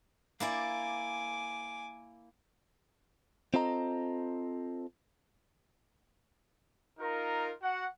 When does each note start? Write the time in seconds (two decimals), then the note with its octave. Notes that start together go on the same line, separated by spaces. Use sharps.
0.40 A#3 E4 D5 G#5 D6
3.54 C4 F4 A4 D#5 A#5
6.99 D#4 F4 A#4
7.61 F#4 F#5